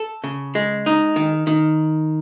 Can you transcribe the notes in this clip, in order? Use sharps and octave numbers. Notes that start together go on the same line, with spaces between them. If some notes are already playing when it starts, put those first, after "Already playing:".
Already playing: A4
C#3
G#3
D#4
D#3
D#3